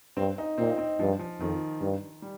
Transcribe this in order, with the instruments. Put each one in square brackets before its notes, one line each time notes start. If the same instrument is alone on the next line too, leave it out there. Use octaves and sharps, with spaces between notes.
[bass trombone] G2 [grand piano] C4
[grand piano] D#4
[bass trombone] A#2 [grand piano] C4
[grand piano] D#4
C4
[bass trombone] G2 [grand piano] F3
[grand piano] F3
[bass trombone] F2 [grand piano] D#3
[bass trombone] G2
[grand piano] G3